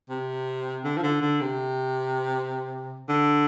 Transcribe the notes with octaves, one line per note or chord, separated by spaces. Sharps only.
C3
D3
F3
D3
D3
C3
D3